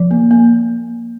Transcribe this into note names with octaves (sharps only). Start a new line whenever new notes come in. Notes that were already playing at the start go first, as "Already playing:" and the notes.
Already playing: F3
A#3
A#3